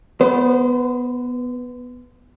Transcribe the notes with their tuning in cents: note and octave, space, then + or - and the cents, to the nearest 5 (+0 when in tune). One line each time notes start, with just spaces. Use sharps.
B3 +0 C5 -30